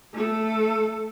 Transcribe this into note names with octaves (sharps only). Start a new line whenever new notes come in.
A3 A4